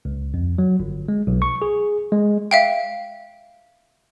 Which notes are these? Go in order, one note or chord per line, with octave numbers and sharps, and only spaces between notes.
C#2
F2
F#3
G1
G#3
B1
C#6
G#4
G#3
E5 F5 G5